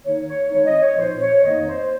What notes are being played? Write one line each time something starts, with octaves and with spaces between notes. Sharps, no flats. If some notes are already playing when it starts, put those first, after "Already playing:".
D#3 A#3 D#4 C#5
C#5
D#3 G#3 C4 D#4 C#5
D#5
C#5
A#2 F3 C4 D#4 C5
C#5
F2 D#3 A#3 D#4 D#5
C5